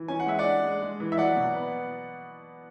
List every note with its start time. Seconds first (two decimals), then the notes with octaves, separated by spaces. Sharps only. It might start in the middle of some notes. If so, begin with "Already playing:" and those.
Already playing: E3
0.08 C#4 G#5
0.20 F#5
0.27 G#3 E5
0.39 D5 F#5
0.45 D4
0.64 G#3
0.82 G#3
1.00 E3
1.12 E5
1.18 F#3 D5 F#5
1.36 B2
1.55 B3